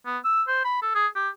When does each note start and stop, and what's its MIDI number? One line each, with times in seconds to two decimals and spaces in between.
0.06 0.18 59
0.25 0.43 88
0.48 0.64 72
0.65 0.79 83
0.82 0.95 69
0.95 1.07 68
1.16 1.29 67